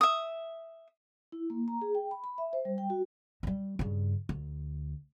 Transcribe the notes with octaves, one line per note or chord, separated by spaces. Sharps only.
E5 D#6
E4
A#3
A#5
G#4
G5
B5
B5
E5
C5
G3
G5
F#4
F#3 G3
G2 C#3
D2